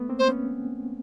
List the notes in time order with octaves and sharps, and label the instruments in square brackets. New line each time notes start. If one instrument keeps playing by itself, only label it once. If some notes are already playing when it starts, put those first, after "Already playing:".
Already playing: [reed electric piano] A3 B3
A#3 C4
[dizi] C5
[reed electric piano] B3 C#4